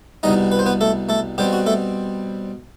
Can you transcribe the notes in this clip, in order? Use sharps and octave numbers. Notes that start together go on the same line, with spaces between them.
C2 B2 G3 D#4 D#5
B4
C5
B3 B4
A3 A4
A3 A4
B2 G3 C4 G4
F#4
A3 A4